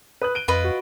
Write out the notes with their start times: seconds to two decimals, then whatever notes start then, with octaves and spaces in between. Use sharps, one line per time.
0.22 B4 D#6 F#6
0.35 D7 D#7 G7
0.48 F2 F4 B4 D#5
0.64 F#4